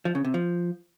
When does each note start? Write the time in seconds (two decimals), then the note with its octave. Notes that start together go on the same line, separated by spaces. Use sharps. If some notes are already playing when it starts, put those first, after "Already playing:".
0.05 F3
0.15 C#3
0.24 C3
0.34 F3